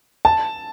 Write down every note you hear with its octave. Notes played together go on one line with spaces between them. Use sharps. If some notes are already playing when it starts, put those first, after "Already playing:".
A5